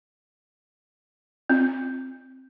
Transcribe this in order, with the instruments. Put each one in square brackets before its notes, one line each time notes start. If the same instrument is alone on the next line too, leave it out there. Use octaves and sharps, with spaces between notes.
[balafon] C4